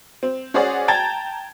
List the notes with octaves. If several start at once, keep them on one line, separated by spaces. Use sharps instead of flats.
C4
C#4 F#4 G#4 C5 D5
G5 A5 A#5 G#6 A6